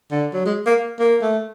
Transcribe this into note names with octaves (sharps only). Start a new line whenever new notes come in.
D3
F#3
G#3
A#3
A#3
A3